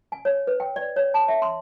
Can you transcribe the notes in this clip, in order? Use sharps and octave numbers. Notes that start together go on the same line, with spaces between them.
G#5
C#5
B4
G5
D5
C#5
A5
E5
C6